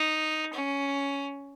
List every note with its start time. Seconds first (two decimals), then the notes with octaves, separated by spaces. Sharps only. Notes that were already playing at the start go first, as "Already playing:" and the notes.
Already playing: D#4
0.53 C#4